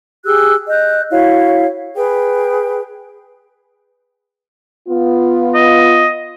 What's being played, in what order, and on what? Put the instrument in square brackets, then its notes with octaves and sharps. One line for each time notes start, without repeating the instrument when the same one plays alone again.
[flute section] G4 G#4 E6 F#6
D#5 F#6 G6
E4 F#4 C#5 F5
G#4 B4 G5
[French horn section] B3 F4
[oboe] D#5